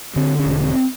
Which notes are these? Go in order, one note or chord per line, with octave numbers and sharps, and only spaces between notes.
D3 C4
C#4
E1
C4